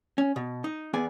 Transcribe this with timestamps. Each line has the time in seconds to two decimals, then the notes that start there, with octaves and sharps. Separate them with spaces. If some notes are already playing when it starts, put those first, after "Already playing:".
0.18 C#4
0.36 B2
0.64 D#4
0.93 E2 B3 G#4 D5 G#5